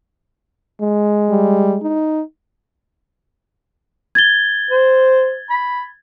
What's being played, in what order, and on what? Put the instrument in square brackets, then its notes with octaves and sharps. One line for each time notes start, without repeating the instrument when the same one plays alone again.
[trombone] G#3
[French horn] G3
D#4
[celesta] G#6 A6 G7
[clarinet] C5
B5